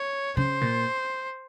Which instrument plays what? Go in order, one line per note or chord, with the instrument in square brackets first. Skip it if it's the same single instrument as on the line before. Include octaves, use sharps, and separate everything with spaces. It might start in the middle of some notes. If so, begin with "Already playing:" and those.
Already playing: [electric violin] C#5
[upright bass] C#3 [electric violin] C5
[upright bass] A#2